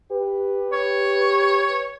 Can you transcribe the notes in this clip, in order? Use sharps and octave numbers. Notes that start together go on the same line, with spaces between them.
G4 B4
C#5